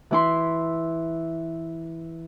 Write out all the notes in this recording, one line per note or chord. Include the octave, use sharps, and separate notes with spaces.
E3 E4 C6